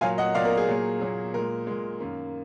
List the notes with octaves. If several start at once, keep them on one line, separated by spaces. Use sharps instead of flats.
A#2 F#3 A#3 F5 G#5
D#5 F#5
A#2 F#3 A#3 D5 F5
A#4
G#4
A#2 F#3 A#3
A#2 F#3 A#3
A#2 G#3 A#4
A#2 G#3
F#2 D#3 A#3